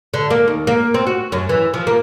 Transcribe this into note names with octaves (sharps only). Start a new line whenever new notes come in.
D3
A#3
D#2
A#3
C4
F#4
F#2
E3
F3
A#3